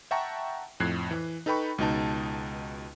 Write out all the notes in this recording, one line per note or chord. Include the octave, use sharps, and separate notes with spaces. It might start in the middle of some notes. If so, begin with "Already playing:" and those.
E5 F#5 G5 A5 A#5 C#6
F2 A2 F#6 G#6 C7
E3
D#4 A4 B4 G5 B5 C#6
C#2 B2 D#4 A5